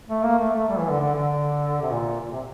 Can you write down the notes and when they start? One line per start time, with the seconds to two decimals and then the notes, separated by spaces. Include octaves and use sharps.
0.09 A3
0.23 A#3
0.39 A3
0.55 A3
0.69 G3
0.79 E3
0.89 D3
1.00 D3
1.14 D3
1.82 C3
1.91 A#2
2.21 A#2
2.31 C3